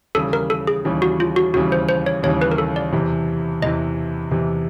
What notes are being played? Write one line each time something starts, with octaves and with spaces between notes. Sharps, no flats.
D#2 C#3 E3 G3 A4
A#4
A4
G#4
D#2 C#3 E3 G3
F#4
F4
F#4
D#2 C#3 E3 G3 F#4
C5
C5
C#5
D#2 C#3 E3 G3 C#5
B4
A#4
A4
D5
E2 C3 E3
E2 C3 E3 D#5
E2 C3 E3